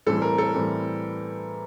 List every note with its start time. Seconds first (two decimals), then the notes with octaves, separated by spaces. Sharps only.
0.06 A2 E3 G3 C4 A4
0.22 A#4
0.38 A4
0.54 A2 E3 G3 C4